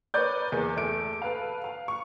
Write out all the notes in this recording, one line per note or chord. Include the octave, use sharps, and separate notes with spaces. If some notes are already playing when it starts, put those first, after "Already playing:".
A#4 B4 C#5 D5 G6
E2 A#3
E2 A3 D7
A4 B4 F5
F5
C#6